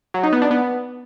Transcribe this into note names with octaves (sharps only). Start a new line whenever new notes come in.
F#3
D#4
B3
D4
B3